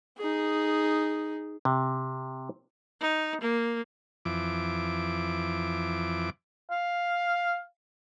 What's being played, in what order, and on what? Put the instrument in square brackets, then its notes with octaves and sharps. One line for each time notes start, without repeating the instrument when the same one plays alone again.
[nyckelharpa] D#4 G#4
[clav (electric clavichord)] C3
[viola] D#4
A#3
[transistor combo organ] F2 E3 D6
[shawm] F5